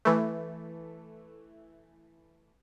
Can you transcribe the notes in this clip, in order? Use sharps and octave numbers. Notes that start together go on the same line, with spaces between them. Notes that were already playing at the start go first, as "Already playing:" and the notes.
E3 A3